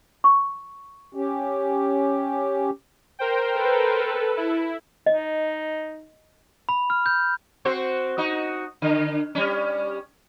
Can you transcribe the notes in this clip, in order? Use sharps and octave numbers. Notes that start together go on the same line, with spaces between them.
C#6
C#4 G4
A#4 C5 G5
A4 B4
E4
D#4 D#5
B5
F6
G6
C4 F#4 C5
D#4 F#4
D3
G3 C#4